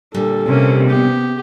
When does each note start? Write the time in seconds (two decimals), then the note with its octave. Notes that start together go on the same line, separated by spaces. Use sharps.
0.14 A#2 D3 G3 A4
0.47 C3 A#3 C#4
0.90 B3 G4